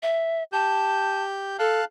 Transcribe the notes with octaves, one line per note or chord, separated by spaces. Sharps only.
E5
G4 A5 G6
A4 F5 A5 F#6